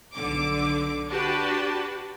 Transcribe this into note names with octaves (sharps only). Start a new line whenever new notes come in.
B1 D3 D6
D4 F#4 G4 B4 A5